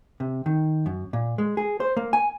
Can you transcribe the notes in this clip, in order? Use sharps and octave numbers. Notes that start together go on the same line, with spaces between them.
C3
D#3
F#2
A#2
G#3
G#4
C5
A#3
G#5